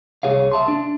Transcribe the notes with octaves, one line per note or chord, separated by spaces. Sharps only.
C2 G#4 C#5 F5
E5 A5 C6
D4